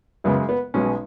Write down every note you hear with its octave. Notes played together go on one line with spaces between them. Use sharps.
F#2 C#3 G#3 B3
B3
B1 B2 G#3 B3 C#4